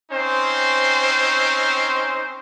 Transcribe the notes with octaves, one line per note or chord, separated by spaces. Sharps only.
C4 C#4 D#4 C5